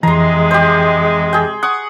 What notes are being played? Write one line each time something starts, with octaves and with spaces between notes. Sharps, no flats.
F2 C3 E3 G#3 A#5 C6
G4 C5
G#4 G5
F#5 C#6 D#6